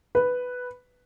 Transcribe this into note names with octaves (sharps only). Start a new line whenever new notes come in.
B4